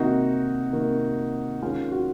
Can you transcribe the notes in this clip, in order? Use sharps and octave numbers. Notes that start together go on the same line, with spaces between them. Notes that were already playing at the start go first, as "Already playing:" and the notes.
Already playing: C3 D#3 A#3 D#4 F#4
C3 D#3 A#3
D#3 G#3 C#4 F4
F#4